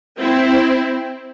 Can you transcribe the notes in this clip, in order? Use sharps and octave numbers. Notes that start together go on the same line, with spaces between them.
C4 E4